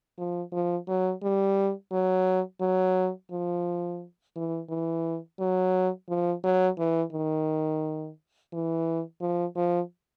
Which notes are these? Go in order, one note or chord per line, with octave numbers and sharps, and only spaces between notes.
F3
F3
F#3
G3
F#3
F#3
F3
E3
E3
F#3
F3
F#3
E3
D#3
E3
F3
F3